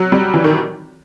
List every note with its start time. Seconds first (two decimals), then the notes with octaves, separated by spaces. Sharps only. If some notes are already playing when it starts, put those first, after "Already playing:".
Already playing: F#3
0.12 G3
0.34 E3
0.44 D#3